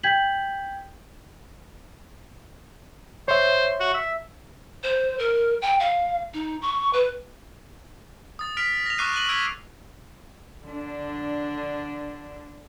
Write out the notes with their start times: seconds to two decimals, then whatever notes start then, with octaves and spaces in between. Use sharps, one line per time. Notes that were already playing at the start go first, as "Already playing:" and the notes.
0.03 G5 G6 G#6 B6 F#7
3.28 C5 C#5 E5
3.80 F#4
3.94 E5
4.83 C5
5.19 A#4
5.62 G5
5.80 F5
6.34 D#4
6.62 C#6
6.93 B4
8.39 D#6 A6
8.57 F6 B6 D7 F7
8.86 A#6 F7
8.98 C#6 D6 F6 F#6 C7 D#7
9.14 F#6 A#6 D#7 F#7
9.29 E6 G#6 B6 D7 D#7
10.66 D3 D4